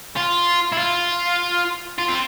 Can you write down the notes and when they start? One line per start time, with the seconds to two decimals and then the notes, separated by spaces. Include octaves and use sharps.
0.17 F4
0.72 E4
0.78 F4
1.99 F4
2.08 C4